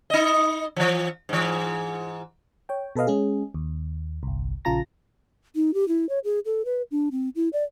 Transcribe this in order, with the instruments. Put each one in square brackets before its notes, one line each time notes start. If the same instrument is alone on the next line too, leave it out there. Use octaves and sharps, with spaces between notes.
[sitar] D#4 D#5
E3 F3
G#2 E3
[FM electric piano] C#5 G5
B2 A4 B4 D#5 F5
G#3 C#4 G#4
D#2
G1 C2
A#1 C#3 F4 A5 A#5 A#6
[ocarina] D#4
G4
E4
C#5
G#4
A4
B4
D4
C4
E4
D5